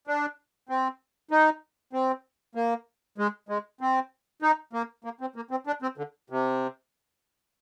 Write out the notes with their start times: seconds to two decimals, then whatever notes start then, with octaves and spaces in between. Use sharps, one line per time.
0.07 D4
0.69 C4
1.31 D#4
1.93 C4
2.55 A#3
3.18 G#3
3.49 G#3
3.81 C4
4.42 D#4
4.73 A#3
5.04 A#3
5.21 C4
5.36 A#3
5.51 C4
5.67 D4
5.82 C4
5.98 D3
6.30 C3